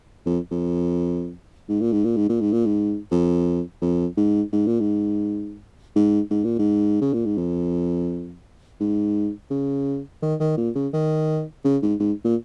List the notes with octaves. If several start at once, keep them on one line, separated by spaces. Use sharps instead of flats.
F2
F2
G#2
A#2
G#2
A#2
G#2
A#2
G#2
A#2
G#2
F2
F2
G#2
G#2
A#2
G#2
G#2
G#2
A#2
G#2
C#3
A#2
G#2
F2
G#2
C#3
D#3
D#3
A#2
C#3
D#3
C#3
G#2
G#2
A#2